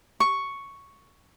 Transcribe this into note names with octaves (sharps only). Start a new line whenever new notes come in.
C#6